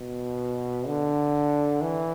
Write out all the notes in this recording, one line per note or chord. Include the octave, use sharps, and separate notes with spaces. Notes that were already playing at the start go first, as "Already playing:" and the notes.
Already playing: B2
D3
E3